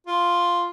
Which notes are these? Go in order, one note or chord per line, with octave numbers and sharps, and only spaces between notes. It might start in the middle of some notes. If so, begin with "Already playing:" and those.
F4